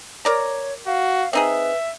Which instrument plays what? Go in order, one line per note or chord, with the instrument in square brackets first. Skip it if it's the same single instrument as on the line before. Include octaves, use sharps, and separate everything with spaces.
[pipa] A#4 D5 A#5 [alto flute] C#5
[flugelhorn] F#4 [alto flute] F5
[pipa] C4 D#4 G#4 [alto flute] B4 [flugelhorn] E5